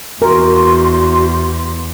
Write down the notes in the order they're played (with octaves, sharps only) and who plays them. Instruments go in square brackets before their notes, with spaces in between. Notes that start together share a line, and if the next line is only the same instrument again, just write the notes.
[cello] E2 [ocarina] F#4 [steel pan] A#4 [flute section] C6